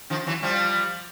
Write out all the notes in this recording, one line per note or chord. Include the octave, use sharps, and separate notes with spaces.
D#3 F3
E3 F#3
F3 G3